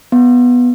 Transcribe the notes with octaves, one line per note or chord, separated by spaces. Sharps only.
B3